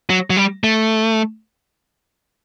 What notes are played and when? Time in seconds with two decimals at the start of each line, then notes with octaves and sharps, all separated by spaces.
0.10 F#3
0.30 F#3
0.37 G3
0.64 A3